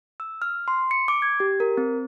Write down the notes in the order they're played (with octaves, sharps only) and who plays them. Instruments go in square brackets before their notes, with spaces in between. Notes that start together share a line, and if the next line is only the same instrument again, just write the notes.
[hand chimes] E6
F6
C6
C#7
D6
G#6
G4
A#4
C4